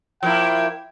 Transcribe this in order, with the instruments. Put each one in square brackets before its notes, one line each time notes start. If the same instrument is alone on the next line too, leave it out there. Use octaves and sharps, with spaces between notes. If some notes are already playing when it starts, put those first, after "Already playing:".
[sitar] F3 A#3 E4 [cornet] G5